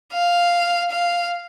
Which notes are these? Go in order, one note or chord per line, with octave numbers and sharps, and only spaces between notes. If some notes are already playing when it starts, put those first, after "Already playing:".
F5
F5